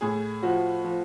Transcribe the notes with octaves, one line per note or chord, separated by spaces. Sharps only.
A2 G#4
F3 F#4
F3